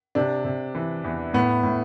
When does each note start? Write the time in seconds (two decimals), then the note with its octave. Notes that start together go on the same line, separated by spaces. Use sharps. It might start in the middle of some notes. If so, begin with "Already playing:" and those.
0.15 C3 D4
0.45 C3
0.75 E3
1.04 E2
1.34 A2 B3
1.63 A2